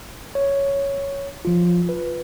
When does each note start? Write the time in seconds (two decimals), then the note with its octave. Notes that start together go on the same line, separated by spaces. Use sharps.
0.35 C#5
1.45 F3 F4
1.89 B4